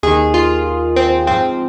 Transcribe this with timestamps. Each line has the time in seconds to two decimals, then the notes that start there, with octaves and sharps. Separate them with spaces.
0.03 D#2 D#3 G#4
0.34 F4
0.96 C4
1.27 G#2 F3 C4